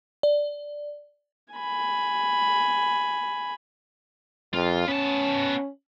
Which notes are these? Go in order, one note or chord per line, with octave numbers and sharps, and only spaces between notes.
D5
G#5 B5
F2 F4
B3 C#4 A5